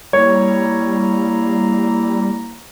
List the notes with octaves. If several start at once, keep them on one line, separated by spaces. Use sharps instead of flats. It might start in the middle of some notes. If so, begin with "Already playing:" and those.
G3 A#3 E4 C#5 A#5